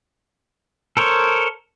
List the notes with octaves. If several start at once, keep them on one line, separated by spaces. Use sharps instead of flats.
A4 A#4 C5 C#5